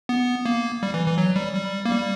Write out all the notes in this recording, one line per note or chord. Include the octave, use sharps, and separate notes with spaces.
B3
A#3
G3
E3
E3
F#3
G3
G3
A#3
G3